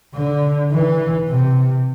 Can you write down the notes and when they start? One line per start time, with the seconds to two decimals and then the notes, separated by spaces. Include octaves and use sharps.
0.14 D3
0.71 E3
1.28 C3